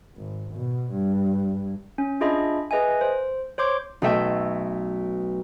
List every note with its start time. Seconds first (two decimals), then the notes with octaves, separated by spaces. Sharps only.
0.17 G#1
0.54 B2
0.92 G2
1.98 C#4
2.21 D4 F4 G#4 D#5 E5 B5
2.71 G#4 B4 D#5 E5 G#5
3.01 C5
3.58 C5 C#5 C6 D6 G6
4.02 B1 A3 E5 G5